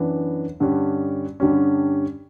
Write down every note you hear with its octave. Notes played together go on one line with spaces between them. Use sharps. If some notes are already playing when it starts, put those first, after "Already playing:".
Already playing: F#2 E3 B3 D4
G2 D3 G3 C#4
G2 D3 G3 C#4